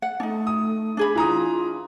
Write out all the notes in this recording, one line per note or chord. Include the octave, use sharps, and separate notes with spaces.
F#5
A3 D4 D#4
D#6
D4 G#4 B5
E3 F4 A#5 D#6